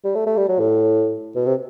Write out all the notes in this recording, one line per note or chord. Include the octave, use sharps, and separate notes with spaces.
G3
A3
A3
G3
F#3
A2
B2
C3